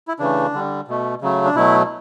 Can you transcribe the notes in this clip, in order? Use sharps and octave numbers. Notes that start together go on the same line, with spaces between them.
E4
C#3 E3 A3 D4
D3 G3
B2 A3
C#3 F#3 A3
D4
B2 F#3 A3 E4